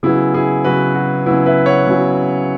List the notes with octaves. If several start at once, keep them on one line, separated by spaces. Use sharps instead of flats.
C#3 F#3 B3 E4 G#4
E4 G#4
C#3 F#3 B3 F#4 B4
F#4
C#3 F#3 B3 E4
B4 E5
C#5 F#5
C#3 F#3 B3